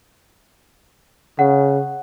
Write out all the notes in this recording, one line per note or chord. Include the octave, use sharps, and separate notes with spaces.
C#3 F#5